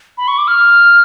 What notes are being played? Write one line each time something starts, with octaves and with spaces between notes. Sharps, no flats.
B5
C#6
D6
F6